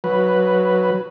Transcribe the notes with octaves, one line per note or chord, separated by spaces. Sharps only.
F#3 B4